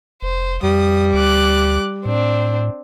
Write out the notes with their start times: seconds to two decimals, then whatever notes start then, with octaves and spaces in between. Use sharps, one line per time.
0.22 F1 C5
0.63 F2 G3 D#6
1.14 D2 D6 F#6
2.06 A2 C4 D4